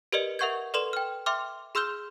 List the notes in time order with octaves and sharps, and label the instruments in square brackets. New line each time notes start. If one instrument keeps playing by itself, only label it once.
[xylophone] G4 A#4 B4 D5 D#5 C#7
A#4 E5 F#5 C#6 G6 G#6
A4 B4 D5 C6 E7 F#7
G5 F6
E5 G5 C6 D6 F6
G#4 C6 E6 F6 G6 G7